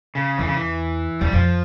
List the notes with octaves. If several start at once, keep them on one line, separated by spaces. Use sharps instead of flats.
C#3
E2 E3
C#3
E3
E2 G3
F2 F3